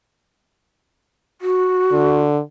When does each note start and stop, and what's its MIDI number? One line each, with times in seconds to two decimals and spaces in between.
1.41 2.22 66
1.92 2.39 50